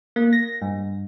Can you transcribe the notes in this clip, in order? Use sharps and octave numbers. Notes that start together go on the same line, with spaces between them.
A#3
A#6
G2